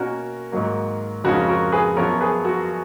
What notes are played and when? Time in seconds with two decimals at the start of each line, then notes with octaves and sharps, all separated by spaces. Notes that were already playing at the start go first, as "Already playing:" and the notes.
Already playing: B2 A#3 C#4 F#4 A#4
0.52 G#2 D#3 F#3 A#3
1.24 F2 C#3 G#3 C#4 F#4 A#4
1.48 F#4 A#4
1.72 G#4 B4
1.97 F#2 F3 B3 A#4 C#5
2.21 G#4 B4
2.45 F#4 A#4